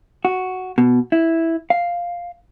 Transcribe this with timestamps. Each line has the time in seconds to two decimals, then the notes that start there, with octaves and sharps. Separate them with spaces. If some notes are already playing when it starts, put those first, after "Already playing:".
0.25 F#4
0.78 B2
1.12 E4
1.70 F5